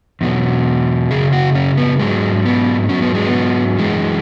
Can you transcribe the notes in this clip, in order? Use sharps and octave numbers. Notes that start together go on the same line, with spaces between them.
E2 B2 F#3
F#2 C#3 G#4
F#4
C#4
B3
G#2 F#3 G#3
B3
G#2 F#3 C#4
B3
G#3
B3
F#2 E3 G#3